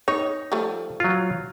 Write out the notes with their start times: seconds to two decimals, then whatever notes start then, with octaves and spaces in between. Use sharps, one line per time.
0.08 D#4 C#5
0.52 F3 G3 A3
1.00 F#3 F4